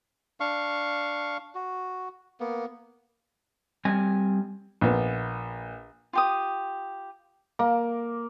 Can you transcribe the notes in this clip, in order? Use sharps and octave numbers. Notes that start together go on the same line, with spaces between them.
D4 F5 C#6
F#4
A#3 B3
G3 C4 G#5
A#1 B3
F4 G4 D#6
A#3